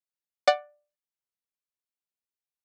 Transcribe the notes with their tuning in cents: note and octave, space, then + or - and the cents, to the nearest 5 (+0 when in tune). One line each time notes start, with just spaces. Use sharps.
D5 +10 F#5 +0